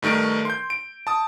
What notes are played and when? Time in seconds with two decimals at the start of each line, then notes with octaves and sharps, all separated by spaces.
0.02 G2 D#3 A3 A#4 D7
0.45 C6 G6
0.70 D7
1.07 A5 D#6